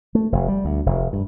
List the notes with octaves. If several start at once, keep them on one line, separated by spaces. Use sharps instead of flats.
A3
F1
G3
D2
F1
G2